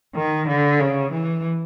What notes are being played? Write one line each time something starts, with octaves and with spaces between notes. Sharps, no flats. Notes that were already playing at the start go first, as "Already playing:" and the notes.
D#3
D3
C#3
E3